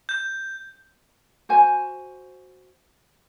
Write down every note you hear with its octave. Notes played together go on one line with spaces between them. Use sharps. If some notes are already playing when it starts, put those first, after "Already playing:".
G6
F#4 C5 G#5